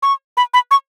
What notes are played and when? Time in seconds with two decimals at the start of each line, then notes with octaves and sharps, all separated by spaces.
0.03 C#6
0.37 B5
0.54 B5
0.71 C#6